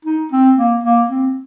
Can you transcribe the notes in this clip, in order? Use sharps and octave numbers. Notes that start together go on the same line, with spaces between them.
D#4
C4
A#3
A#3
C4